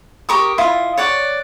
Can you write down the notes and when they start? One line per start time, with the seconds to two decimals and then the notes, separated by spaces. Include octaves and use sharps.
0.29 G4 A#4 C#6 D#6
0.58 E4 F4 D#5
0.98 C#5 D5 F#5